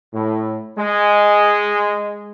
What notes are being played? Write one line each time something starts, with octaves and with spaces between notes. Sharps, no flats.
A2
G#3